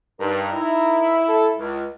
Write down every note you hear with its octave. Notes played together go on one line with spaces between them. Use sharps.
G2 D#4 A#4
E4
A4
C#2